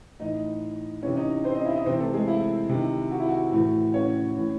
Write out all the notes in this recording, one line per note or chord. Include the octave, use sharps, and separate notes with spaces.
A2 E3 D#4 D#5
C3 E3 C#4 C#5
D#4 D#5
C4 C5
D#4 D#5
E4 E5
D#4 D#5
C3 E3 C4 C5
A3 A4
G#3 G#4
E4
C3 D#3
F#4
E4
F#4
A2 E3
C#4 C#5
A2 E3